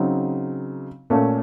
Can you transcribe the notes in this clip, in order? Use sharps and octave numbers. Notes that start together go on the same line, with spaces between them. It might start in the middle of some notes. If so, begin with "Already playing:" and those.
Already playing: C#3 F#3 C4 D#4
A#2 A3 C#4 A4